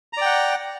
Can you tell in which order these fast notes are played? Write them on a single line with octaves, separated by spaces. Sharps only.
A#5 D5 G5 F#5